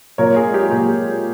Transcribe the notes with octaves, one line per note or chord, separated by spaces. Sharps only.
A#2 A#4 C#5
G#4
G#3
G4
A#2 G4
G#3